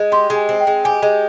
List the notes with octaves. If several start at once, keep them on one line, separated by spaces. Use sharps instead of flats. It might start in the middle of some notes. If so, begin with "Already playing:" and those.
Already playing: G#3
G4 C6
G#3
G#5
C4
G5
G#3
G4 G#5
G#3